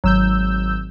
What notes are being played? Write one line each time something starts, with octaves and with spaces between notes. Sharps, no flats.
G#1 F#3 E6 G6